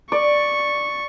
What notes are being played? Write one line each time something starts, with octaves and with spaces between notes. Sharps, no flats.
D5 C#6